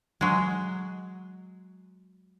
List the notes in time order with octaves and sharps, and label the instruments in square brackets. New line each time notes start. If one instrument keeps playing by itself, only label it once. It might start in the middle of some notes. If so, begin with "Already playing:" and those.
[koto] F#3 G#3